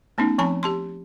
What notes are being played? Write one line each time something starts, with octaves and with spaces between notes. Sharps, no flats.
A3 B3 C#4 D#4
F3 C4 G#5 A5 B5
G4 A5 C6